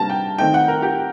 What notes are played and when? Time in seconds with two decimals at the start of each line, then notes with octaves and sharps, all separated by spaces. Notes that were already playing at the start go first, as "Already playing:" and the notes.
Already playing: C3 G3 A#3 D4 A5 A#5
0.10 G5
0.38 D#3 A3 C4 D#4 G5
0.54 F#5
0.68 A#4
0.82 G4